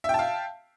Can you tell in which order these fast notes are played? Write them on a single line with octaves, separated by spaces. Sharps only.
E5 G5 A5 F5